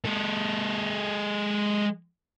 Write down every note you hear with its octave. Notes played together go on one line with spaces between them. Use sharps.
G#3 A4